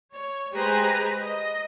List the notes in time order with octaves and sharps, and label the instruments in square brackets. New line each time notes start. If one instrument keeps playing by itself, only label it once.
[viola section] C#5
G#3 G4 B4 C5 G#5 A#5
D#5